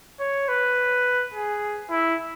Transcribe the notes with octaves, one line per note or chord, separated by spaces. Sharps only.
C#5
B4
G#4
E4